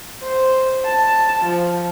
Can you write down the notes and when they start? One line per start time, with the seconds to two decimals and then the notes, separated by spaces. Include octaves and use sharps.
0.22 C5
0.85 A5
1.44 F3